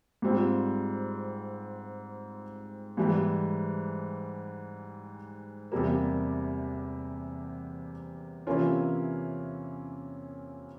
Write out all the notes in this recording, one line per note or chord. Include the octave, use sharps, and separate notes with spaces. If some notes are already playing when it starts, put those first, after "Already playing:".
G#2 G3 C4 F4
G#2 E3 G3
E2 C3 G3 A#3
C3 E3 A#3 C#4 F4